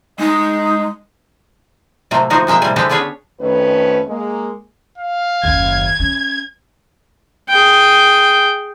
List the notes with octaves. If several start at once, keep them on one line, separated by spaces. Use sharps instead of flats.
G#3 D#4 D#5 G#5
A2 C3 F#3 A3 A#3
D3 F3 D#4 F4 F#4 C5
B2 G#3 A#3 E5 G5
A2 C3 G3 G#5
D3 G#3 C4 G4 A4 B4
B3 C#4 D4 G#4 B4 C#5
F2 D#3 A3 C#4 B4
G#3 A#3
F5
F#1 D#2 G#6
C#4
G#4 G5